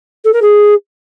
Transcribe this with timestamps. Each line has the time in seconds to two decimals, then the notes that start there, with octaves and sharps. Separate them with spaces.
0.25 A4
0.33 A#4
0.42 G#4